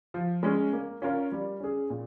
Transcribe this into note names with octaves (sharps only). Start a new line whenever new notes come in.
F3
G#3 C#4
A#3
C#4 F4 A#4 C#5
G3
C#4 G#4
A#2